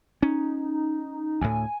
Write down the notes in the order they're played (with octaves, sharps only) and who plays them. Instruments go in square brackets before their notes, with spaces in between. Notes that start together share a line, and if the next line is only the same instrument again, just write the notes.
[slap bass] C#4 [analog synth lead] D#4
[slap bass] D2 A2 [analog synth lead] G#5